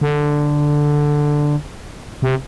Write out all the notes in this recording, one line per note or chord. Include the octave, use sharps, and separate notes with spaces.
D3
C3